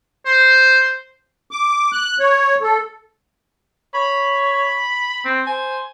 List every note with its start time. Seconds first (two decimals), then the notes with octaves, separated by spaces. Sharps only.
0.26 C5
1.51 D6
1.92 F#6
2.20 C#5
2.62 A4
3.94 C#5 B5
5.25 C4
5.47 C5 G#5